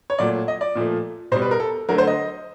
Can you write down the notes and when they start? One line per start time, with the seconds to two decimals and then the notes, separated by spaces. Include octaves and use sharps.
0.10 C#5
0.19 A#2 F#3 A3 D5
0.48 D#5
0.61 D5
0.75 A#2 F3 A3
1.32 B2 C5
1.36 G3
1.42 B4
1.51 A#4
1.60 A4
1.89 D3 F#3 A3 A#4
1.98 C5
2.07 D#5